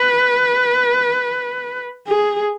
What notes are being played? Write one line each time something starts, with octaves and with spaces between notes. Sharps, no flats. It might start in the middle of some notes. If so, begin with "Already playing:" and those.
Already playing: B4
G#4